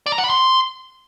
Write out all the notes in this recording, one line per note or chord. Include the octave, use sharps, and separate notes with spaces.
D5
A#5
F#5
B5
C6